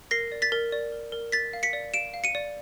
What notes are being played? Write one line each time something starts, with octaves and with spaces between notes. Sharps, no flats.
A#4 A#6 C7
D5
A6 B6
A#4
D5
A#4
A#4
A#4 A6 B6
F5
B6 C#7
D5
F5 D7 E7
F5
C#7 D#7
D5